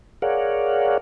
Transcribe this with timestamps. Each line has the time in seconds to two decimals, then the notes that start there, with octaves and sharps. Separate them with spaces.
0.22 G#4 A#4 C#5 D5 F5 F#5